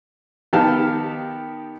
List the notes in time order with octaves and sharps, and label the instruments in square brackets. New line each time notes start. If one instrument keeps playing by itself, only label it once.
[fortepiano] D#3 B3 G4 F5 A5 F6